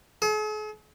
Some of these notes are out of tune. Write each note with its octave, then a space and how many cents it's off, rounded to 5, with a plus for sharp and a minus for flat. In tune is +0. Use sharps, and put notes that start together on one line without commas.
G#4 +45